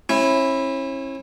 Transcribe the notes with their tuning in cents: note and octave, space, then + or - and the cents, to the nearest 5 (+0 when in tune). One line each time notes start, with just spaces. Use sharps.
C#4 -40 E4 +0